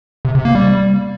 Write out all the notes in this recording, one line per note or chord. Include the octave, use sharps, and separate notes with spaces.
C3
C3
A#3
G3